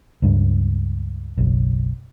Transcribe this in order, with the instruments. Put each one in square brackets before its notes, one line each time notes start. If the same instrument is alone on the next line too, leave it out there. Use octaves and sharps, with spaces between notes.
[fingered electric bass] C#2 G2
F#1 B1